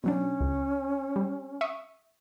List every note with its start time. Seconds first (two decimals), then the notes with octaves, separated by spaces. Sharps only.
0.04 B2 F#3 C#4 D4
0.40 C#2
1.16 G3
1.61 E5 C#6 D#6